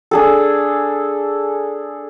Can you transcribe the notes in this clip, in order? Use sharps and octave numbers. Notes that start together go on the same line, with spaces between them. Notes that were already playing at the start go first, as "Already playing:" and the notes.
D4 G#4 A4